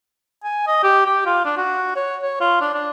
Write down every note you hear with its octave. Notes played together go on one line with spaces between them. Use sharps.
G#5
D#5
G4
G4
F4
D4
F#4
C#5
C#5
F4
D4
D4